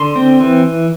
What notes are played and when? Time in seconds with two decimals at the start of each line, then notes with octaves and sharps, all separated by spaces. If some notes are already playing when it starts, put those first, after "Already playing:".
Already playing: D3 C6
0.16 C4
0.40 E3